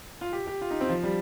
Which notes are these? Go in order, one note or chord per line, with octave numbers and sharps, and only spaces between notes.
F4
G4
G4
F4
D#4
C4
F3
G3